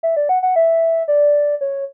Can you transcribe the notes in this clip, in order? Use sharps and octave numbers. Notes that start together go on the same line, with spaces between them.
E5
D5
F#5
F#5
E5
D5
C#5